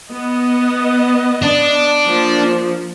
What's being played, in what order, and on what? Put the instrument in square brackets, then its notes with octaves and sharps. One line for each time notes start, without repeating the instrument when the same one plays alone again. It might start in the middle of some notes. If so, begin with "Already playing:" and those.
[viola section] B3 D#5
[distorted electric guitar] D4
[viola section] F3 A#3